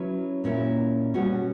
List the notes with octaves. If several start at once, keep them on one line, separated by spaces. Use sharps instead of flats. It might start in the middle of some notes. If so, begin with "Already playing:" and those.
Already playing: F#3 C#4 E4 B4
A#2 A#3 C#4 E4
B2 G3 C#4 F#4